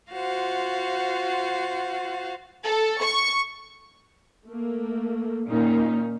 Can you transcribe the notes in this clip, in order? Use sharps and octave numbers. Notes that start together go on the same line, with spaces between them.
F4 F#4 C5 F5 F#5
A4
C#6
A3 A#3
A#2 D#3 C#4 D#4